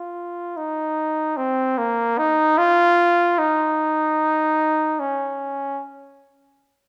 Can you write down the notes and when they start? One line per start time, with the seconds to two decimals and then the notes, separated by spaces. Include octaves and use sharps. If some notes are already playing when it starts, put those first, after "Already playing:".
Already playing: F4
0.57 D#4
1.37 C4
1.78 A#3
2.18 D#4
2.58 F4
3.38 D#4
5.00 C#4